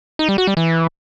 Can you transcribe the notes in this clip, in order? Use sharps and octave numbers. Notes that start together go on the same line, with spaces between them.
D#4
G3
F#4
G3
E3